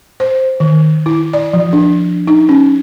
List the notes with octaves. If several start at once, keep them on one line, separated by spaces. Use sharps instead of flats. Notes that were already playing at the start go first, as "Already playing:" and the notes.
C5
D#3
E4
D5
F3
D4
D#4
C#4